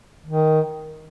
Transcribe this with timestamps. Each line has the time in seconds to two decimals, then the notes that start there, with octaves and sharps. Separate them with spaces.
0.26 D#3